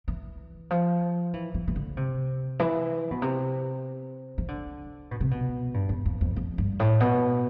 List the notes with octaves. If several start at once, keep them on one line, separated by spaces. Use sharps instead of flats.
E3
F3
E3
E3
E3
D3
C3
E3
B2
C3
E3
D3
B2
C3
B2
G2
E2
F2
F2
F2
G2
A2
B2